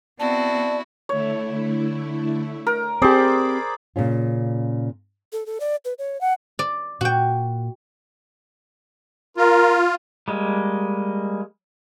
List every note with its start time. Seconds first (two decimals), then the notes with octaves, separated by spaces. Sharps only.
0.20 B3 C4 E4 F#4 D5 A5
1.09 D3 A3 E4 C#5
2.67 A#4
3.02 C4 G4 G#4 C5 D5 B5 D6
3.96 A#2 C#3 C#4 F4
5.32 A4
5.46 A4
5.60 D5
5.85 B4
5.98 C#5
6.21 F#5
6.59 D5
7.01 A#2 F#4 G5
9.37 F4 A#4
10.28 G3 G#3 A#3